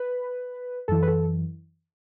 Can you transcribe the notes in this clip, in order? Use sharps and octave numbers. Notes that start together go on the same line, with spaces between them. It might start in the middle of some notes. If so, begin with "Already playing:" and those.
Already playing: B4
F#2 E3 A4
B4
A4